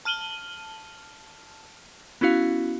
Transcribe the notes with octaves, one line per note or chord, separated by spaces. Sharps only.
A5 F6 D#7 F#7 G7
B3 C#4 E4 F#4 F5